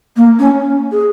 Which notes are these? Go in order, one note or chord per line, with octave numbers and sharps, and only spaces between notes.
A#3
C#4
G#4